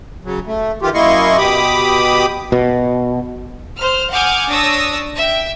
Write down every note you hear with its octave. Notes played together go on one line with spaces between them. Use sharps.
C#3 F#3
A3
D#3 E3 F4 G4
F#2 A#3 E4 D#5 C6 C#6
B2 G4 B5 D6 D#6
B2
C5 F6
F#5 G#5 D6 D#6 F6 G6
D4 C#5 D#6 E6 A#6
E5 G5